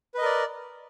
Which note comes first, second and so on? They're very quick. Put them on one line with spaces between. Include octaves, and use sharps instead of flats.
B4 D#5 A#4 D5